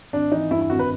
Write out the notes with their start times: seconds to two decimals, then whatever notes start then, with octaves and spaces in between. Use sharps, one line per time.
0.13 G#1 D4
0.32 E3 D#4
0.51 G2 E4
0.61 E4
0.70 G#1 F#4
0.79 B4